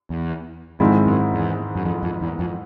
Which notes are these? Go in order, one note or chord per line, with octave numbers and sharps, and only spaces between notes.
E2
F2 G#2 D#3 G#3 C4 E4
F#2
E2
F#2
F2
F2
E2
F2